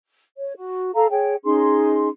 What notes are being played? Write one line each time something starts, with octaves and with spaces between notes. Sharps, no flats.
C#5
F#4
A4 F5 A#5
G#4 C#5 G5
C#4 D#4 G#4 C6